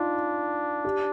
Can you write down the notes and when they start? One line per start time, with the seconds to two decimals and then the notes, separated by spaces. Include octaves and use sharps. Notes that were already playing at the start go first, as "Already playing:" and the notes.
Already playing: D4 D#4 F4
0.85 G4